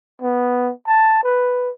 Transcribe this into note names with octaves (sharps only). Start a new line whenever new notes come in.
B3
A5
B4